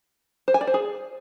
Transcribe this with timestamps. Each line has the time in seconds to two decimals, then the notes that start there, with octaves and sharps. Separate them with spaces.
0.48 C5
0.54 G#5
0.61 D5
0.67 C5
0.74 G#4